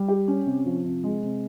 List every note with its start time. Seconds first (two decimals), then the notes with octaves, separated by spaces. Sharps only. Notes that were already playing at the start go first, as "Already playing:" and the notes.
Already playing: G3
0.08 G4
0.28 C#4
0.46 C3
0.66 F3
0.85 C3
1.04 G#3
1.23 C3